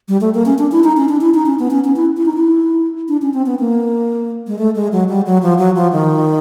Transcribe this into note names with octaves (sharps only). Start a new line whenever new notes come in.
G3
A3
A#3
C#4
D4
E4
D#4
C#4
D4
E4
D#4
C#4
B3
C#4
C#4
E4
E4
D#4
E4
D4
C#4
C4
B3
A#3
G#3
A3
G#3
F#3
G3
F#3
F3
F#3
F3
D#3